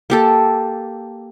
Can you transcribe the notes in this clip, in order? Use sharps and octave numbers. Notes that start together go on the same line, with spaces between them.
A#3 G4 A4